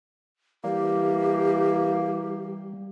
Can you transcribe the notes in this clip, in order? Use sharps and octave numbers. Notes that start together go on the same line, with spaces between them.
E3 G3 A#3 G4